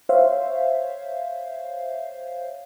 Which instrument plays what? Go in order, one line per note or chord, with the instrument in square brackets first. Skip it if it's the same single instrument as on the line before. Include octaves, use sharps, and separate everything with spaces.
[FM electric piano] C5 C#5 E5 F5